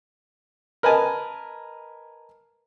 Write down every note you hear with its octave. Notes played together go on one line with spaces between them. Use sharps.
A#4 B4 D#5 G#5 A5